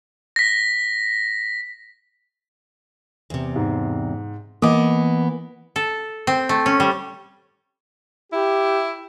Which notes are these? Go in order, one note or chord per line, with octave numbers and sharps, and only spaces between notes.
A#6 B6
E2 C3
G#2
E3 A#3 B3 D#5 D6 D#6
A4
C4
A3
C#4
G3
E4 G4